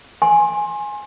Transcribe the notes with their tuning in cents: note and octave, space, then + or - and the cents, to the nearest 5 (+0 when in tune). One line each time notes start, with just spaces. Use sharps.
G#5 +0 C6 +25